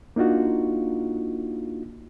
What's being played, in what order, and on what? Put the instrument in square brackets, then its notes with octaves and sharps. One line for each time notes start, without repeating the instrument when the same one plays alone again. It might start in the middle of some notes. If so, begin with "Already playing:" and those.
[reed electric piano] A#3 D4 D#4 F4 F#4